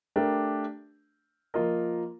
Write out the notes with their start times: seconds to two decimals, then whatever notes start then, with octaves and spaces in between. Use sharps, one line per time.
0.16 A3 D4 G4 A#4
1.54 F3 A#3 F4 A#4 D#5